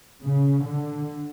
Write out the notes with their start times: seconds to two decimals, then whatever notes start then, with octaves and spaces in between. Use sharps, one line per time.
0.24 C#3
0.66 D3